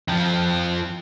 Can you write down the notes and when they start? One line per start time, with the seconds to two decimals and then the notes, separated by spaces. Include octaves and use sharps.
0.08 F2 F3